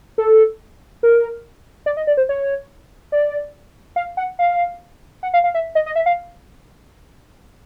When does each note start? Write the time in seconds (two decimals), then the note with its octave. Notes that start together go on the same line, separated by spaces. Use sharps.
0.18 A4
1.03 A#4
1.86 D5
1.97 D#5
2.07 D5
2.17 C5
2.29 C#5
3.12 D5
3.96 F5
4.17 F#5
4.39 F5
5.23 F#5
5.34 F5
5.44 F5
5.55 E5
5.75 D#5
5.86 D#5
5.96 E5
6.06 F5